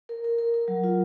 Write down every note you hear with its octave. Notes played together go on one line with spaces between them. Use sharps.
A#4
A#4
A#4
A#4
F#3
F4